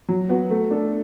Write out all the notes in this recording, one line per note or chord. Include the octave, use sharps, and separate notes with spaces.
F#3
B3 F#4
A3
D4 A4